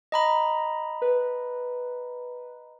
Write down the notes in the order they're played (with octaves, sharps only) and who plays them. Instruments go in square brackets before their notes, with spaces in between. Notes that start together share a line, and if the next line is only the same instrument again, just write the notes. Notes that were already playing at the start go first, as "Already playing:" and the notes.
[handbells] D#5 A#5 B5
[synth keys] B4